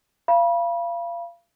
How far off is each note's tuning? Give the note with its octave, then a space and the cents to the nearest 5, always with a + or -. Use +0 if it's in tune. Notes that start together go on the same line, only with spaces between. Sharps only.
F5 -30 B5 -30